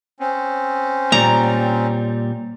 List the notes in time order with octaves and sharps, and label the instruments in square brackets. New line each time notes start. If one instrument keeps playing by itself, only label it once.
[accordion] C4 C#4
[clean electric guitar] A#2 G3 [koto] A#5